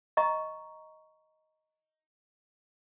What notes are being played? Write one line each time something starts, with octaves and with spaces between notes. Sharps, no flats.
D#5 A#5 C#6